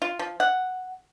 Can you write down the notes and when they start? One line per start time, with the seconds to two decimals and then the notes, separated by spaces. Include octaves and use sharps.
0.02 F4
0.19 F3
0.40 F#5